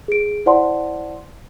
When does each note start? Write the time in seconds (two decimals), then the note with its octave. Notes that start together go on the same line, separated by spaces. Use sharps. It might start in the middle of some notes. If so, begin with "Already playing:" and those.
0.08 G#4 D7
0.46 E4 C5 D5 F#5 A5 C6